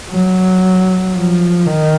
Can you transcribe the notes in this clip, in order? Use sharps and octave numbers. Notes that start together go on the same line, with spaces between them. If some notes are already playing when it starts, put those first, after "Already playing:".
F#3
F3
D#3